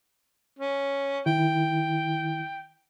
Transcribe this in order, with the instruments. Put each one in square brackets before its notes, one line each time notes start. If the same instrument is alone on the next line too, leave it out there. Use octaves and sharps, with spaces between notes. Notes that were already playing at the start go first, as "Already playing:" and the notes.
[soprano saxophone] C#4
[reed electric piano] D#3 E4 [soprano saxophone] G5